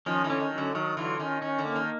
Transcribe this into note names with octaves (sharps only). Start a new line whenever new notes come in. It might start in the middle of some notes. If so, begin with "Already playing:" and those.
D#3 F3 C#4
D3 E3
C#4
D#3
F#3
D3
D#3 F#3
D3 E3 F4
D#3 C#4
D#3 C#4
D3
A#3
D#3